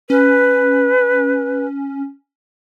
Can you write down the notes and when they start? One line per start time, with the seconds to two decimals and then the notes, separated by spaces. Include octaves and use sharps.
0.10 C#4 B4